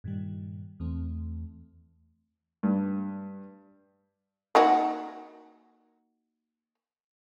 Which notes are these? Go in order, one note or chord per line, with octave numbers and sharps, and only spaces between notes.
G2 A#2 D#3 G3
E2 E3 A3 C4
G2
A#3 D#4 F#4